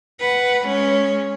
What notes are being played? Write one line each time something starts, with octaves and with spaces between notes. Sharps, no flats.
B4 F#5
G#3 C#4